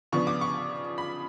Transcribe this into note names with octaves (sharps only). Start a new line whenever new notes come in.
C#3 F3 B3 D4 C#6
D6
C#6
B5